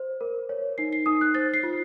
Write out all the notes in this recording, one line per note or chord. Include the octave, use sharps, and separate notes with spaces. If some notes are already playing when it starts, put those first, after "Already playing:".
Already playing: C5
A#4
C#5
D#4 C7
C7
D#4 D#6
F#6
C5 A6
C7
F4